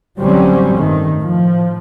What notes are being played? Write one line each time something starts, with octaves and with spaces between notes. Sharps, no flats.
A1 D3 F#3 G3 C4 C#4
G2 D#3 A3
A2 F3